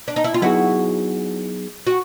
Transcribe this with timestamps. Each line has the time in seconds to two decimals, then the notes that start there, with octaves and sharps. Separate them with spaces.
0.08 D4
0.16 D#4
0.24 E4
0.34 F4
0.42 F#3 B3 D#4 E4 F#4 G#4
1.87 F#4